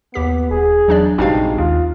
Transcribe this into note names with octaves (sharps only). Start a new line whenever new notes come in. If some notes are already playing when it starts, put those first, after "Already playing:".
D#2 B3 G4 B6
D#1 G#4
E2 F#3 D4 D5
A#1 G2 C3 G#3 D#4 F#4 F5
D#2 F4